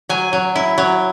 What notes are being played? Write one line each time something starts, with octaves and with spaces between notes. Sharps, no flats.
F#3 G#5
F#3
E4
F#3